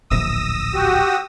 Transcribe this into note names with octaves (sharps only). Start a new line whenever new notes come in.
D1 A#1 E2 D#6 E6 A#6
F#4 G4